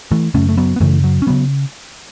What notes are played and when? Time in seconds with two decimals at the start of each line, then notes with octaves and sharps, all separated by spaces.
0.11 E3 A3
0.34 F#2 C#3 A3 C#4
0.49 A3
0.57 F#3 B3
0.76 B3
0.80 F#2 C#3 E3 A3
1.04 F#3
1.22 C#4
1.27 C#3 F#3 B3